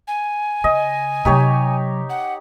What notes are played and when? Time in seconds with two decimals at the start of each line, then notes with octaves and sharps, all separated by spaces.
0.07 G#5
0.64 C#3 D#5
1.25 C3 F#3 D#4 G4 C#5
2.09 F#5